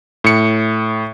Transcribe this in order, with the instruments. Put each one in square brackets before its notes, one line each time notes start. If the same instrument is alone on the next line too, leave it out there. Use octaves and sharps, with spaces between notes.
[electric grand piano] A2 C#7